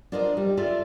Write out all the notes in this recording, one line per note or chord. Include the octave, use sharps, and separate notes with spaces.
D4 F4 A#4 C5 D5 D#5
G3
F4 A4 D5 E5